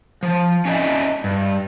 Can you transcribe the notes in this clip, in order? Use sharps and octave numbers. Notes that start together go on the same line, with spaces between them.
F3
C#4 D4 C5 D#5 E5
G2